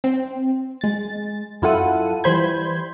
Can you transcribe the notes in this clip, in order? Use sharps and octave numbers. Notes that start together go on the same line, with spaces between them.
C4
G#3 A6
F#2 E4 F4 A4 F#5 D#7
E3 G3 C5 B5 G6 G#6